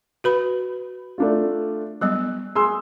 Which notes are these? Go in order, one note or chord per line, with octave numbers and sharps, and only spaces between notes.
F#4 B4 B5
A3 D4 F4
F#3 G3 B3 F#6
G#4 C6 E6